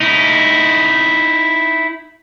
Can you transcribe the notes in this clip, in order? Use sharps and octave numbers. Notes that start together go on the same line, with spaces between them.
D#4 E4